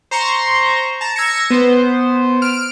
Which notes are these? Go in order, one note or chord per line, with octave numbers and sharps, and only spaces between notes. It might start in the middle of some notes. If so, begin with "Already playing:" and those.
C5 A#5 C6 C#6
A5 A#5
E6 G#6 A#6 C#7
B3 C5
F6 D7